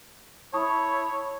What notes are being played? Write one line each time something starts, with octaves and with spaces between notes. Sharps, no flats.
E4 C#5 A5 C#6 D#6